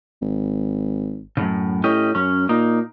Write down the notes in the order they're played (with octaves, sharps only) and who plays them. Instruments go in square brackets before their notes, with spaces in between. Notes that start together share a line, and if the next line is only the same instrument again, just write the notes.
[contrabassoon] G#1
[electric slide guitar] F#2 A2 C#3
[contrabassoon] A2 [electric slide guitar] C#4 G4 D#5
[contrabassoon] F#2 [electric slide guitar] C#4
[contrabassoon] A#2 [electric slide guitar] A#3 D#4